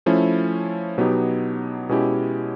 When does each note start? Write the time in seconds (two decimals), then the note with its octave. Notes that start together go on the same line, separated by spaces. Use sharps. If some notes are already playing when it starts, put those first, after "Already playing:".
0.06 F3 A3 C#4 E4
0.98 B2 F#3 B3 D#4 G4
1.89 B2 G#3 C#4 E4 G4